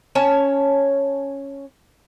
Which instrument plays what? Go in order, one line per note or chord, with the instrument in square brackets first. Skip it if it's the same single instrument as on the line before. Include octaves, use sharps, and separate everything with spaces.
[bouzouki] C#4 C#5 A5